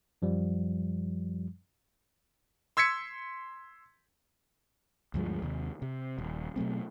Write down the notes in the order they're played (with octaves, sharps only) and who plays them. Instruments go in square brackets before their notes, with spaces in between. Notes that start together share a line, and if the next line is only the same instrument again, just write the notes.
[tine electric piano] F#2 F3 G3
[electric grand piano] C6 E6 G#6 B6 C#7
[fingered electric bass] D2 G2 F3 G#3
D#2 C3
C3
D#1
B2 F#3 A3 C4